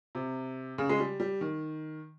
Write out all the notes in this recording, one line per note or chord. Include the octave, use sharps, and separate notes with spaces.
C3
C#3
G#3
G3
G3
D#3